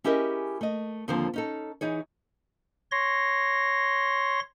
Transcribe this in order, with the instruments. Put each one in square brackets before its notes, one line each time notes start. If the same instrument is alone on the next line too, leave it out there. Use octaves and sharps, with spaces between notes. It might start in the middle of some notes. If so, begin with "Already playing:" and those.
[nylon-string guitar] C#4 E4 G4 G#4 A#4 D#5
A3 D#5
D#2 D3 F3 C4 C5
C#4 D#4 A4
E3 D#4 G#4 C#5
[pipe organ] C#5 C6 A#6